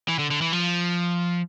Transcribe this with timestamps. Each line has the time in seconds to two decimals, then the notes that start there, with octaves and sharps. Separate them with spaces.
0.08 E3
0.19 D3
0.31 D3
0.42 E3
0.53 F3